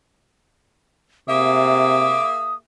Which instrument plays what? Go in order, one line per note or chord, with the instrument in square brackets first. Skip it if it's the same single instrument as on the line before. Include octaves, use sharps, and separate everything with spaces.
[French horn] C3 [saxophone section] A#3 G#4 E5 [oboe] D6 [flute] D#6